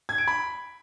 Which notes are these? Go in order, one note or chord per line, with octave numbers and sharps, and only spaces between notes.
G#6
D7
B5